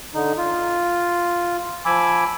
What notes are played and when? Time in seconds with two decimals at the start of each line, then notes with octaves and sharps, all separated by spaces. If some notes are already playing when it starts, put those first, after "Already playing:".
0.15 D3 D#4
0.37 F4
1.86 F3 G#5 B5 D6 E6